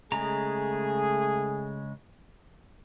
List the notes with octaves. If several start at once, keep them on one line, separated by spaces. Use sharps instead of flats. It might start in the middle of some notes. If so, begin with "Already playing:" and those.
C#3 G#3 A3 G#4 A#5